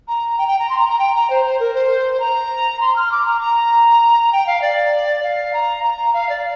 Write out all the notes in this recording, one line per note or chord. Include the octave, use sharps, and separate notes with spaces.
A#5
G5
G5
A#5
C6
A#5
A#5
G5
A#5
C5
C5
A#4
C5
A#5
C6
F6
D6
A#5
A#5
G5
F5
D5
F5
A#5
A#5
F5
D5